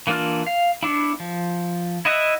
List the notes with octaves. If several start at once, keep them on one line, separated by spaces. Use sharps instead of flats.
E3 A#3 D4 F4 F6
F5
B3 D4 E4
F3
E4 D#5 E5 F#5